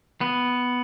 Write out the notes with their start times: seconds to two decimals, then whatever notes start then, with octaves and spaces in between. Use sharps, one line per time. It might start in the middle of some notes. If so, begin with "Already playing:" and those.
0.21 B3